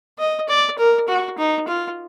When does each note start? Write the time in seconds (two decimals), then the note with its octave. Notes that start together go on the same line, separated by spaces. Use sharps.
0.19 D#5
0.48 D5
0.78 A#4
1.08 F#4
1.38 D#4
1.67 F4